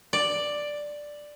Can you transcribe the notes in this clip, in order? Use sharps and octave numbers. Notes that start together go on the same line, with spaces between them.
D5